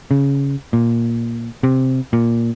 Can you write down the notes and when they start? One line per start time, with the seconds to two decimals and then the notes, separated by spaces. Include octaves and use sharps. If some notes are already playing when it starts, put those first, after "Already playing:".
0.11 C#3
0.73 A#2
1.63 C3
2.13 A#2